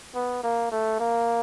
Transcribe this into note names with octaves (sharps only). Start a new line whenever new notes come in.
B3
A#3
A3
A#3